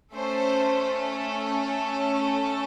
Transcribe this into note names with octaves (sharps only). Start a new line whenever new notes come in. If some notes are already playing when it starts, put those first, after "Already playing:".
A3 C#4 A4 C5